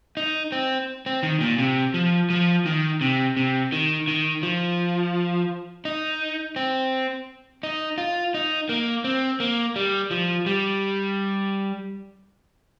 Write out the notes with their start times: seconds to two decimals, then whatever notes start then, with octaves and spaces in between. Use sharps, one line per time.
0.17 D#4
0.52 C4
1.06 C4
1.23 D#3
1.41 A#2
1.58 C3
1.94 F3
2.30 F3
2.66 D#3
3.01 C3
3.37 C3
3.72 D#3
4.08 D#3
4.43 F3
5.85 D#4
6.56 C4
7.63 D#4
7.98 F4
8.34 D#4
8.69 A#3
9.04 C4
9.40 A#3
9.76 G3
10.11 F3
10.46 G3